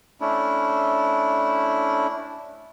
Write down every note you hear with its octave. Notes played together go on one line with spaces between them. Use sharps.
A3 C#4 D4 E4